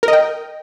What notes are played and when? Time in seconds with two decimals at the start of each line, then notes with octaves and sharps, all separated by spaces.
0.03 A#4
0.08 D#5
0.13 G5